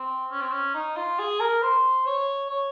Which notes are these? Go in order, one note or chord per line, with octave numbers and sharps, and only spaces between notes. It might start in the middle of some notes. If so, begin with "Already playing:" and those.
Already playing: C4
C#4
C4
C#4
D#4
F4
G#4
A#4
C5
C#5
C#5